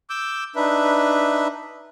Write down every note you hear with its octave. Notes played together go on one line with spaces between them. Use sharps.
D6 E6 G6
D4 D#4 B4 E5